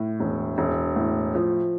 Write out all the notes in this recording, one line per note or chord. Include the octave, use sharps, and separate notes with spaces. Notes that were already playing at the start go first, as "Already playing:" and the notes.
Already playing: A2
E1
E1
A2
F3